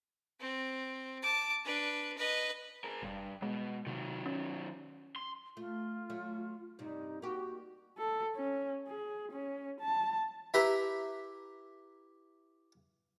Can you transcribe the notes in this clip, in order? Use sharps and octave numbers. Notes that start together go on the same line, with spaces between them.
C4
A5 D6
D4 B4
B4 D#5
G#4 A#4
F1 G2
B2 G#3
C3 D#3 F#3
C#4
C6
A3 F4
F#3 A3
G2 C3 D#4
A#3 F#4 G4
A4
C#4
G#4
C#4
A5
E4 G4 B4 E5 A#5 C6